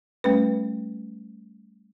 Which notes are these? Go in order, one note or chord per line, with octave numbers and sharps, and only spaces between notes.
G3 A3 C#4 B4